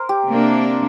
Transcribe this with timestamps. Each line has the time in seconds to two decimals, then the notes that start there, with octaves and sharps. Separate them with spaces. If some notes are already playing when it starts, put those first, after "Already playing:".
Already playing: A#4 C5
0.09 G4
0.28 C3 A#3 D4